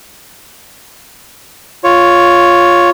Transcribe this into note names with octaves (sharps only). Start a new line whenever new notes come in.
F4 C#5